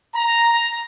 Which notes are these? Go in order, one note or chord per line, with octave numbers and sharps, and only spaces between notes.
A#5